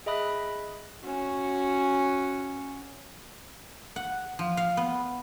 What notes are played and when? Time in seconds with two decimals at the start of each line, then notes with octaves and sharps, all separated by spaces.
0.06 G#4 D#5 E5 B5 D#6 F#6
1.04 C#4 F#4
3.96 F#5
4.39 F3
4.57 F5
4.77 B3